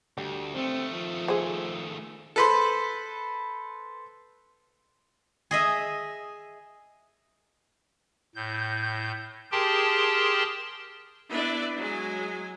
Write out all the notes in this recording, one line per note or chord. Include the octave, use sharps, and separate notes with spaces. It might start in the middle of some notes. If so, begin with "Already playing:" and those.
D2 G3
D#3 A3 C4
F3
G#4 C5
A4 B4 C5
G#4 D#5 E5
A2 G6
G4 G#4 A#4 G5 A5 C6
B3 D4 E4 B4 D5 E5
F#3 G#3 G#5